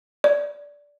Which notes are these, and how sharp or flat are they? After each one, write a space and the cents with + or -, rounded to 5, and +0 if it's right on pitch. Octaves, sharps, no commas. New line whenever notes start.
D5 -10